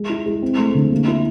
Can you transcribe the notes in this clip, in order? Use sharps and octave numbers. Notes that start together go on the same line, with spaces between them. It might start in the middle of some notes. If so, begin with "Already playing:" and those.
Already playing: G#3
E4
G#3
C4
A3
D3
A#3
E4